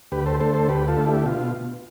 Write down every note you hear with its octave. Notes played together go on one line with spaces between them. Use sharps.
D2 G4 B4
A4 C5
D3 A3 A4 C5
A4 C5
D2 G4 B4
F4 A4
D3 A3
E4 G4
B2 F4